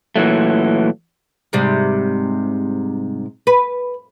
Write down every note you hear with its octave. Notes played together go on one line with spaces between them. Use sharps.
A#2 E3 F#3 A3
G#2 C3 G3
B4